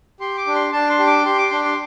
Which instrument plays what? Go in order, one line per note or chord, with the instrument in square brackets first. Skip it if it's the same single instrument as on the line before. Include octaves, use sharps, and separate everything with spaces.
[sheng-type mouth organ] G4 C6
D6
D4
C6
D4 A5
C6
G4
D6
G4 C6
D6
D4 C6
C6